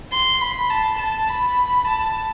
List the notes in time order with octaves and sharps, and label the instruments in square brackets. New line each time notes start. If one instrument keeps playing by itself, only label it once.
[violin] C6
B5
A5
A5
B5
A5